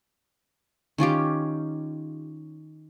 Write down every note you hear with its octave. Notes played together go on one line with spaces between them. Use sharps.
D#3 C#4 F4 G4